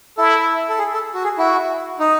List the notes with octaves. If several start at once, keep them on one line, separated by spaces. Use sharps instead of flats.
E4 A4
A4
G#4
A4
F#4
G#4
E4 F#4
D#4